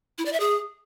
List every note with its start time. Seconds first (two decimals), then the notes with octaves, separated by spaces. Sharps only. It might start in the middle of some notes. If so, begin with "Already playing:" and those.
0.18 E4
0.25 D5
0.33 E5
0.40 G#4